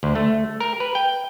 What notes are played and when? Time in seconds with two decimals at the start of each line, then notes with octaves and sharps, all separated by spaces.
0.03 D2
0.15 A3
0.60 A#4
0.80 B4
0.95 G5